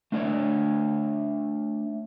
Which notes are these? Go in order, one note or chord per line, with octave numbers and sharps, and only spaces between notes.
A3 D4 C#5 D5